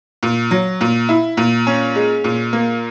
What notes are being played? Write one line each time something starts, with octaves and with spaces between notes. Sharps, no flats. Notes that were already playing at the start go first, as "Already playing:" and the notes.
A#2
F#3
A#2
E4
A#2
C#4
G#3
A#2
A#3